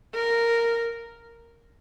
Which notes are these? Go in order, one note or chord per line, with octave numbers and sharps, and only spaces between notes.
A#4